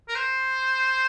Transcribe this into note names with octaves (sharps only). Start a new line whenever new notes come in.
A#4
C5